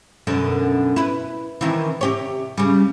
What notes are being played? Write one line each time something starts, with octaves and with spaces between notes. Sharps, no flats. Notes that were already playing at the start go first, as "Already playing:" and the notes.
F#2 B2 D3
E4 B4
C3 D#3 E3
C3 G4 C#5
C#3 G3